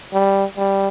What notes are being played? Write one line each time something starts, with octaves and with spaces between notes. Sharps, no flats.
G3
G3